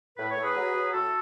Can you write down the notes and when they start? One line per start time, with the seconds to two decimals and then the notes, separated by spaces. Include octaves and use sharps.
0.17 A2 B4
0.30 C#5
0.36 A2
0.43 G#4 B4
0.55 F#3
0.74 F#3
0.93 A2 F#4 A4